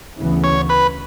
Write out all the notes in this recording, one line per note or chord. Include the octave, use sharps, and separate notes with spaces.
D2 C#3 E3 B3
C#5
B4